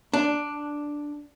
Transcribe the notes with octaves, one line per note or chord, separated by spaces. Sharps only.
D4